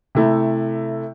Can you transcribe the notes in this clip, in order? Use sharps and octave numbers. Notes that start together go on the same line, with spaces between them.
C3 A3 E4